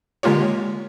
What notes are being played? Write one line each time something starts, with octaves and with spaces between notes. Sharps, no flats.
D3 G#3 A#3 F4 G4 C#5